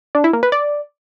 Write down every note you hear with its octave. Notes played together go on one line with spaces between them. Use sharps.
D4
E4
A#3
B4
D5